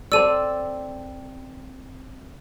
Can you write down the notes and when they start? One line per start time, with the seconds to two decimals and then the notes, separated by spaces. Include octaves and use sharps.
0.12 C4 A4 D5 E6 D#7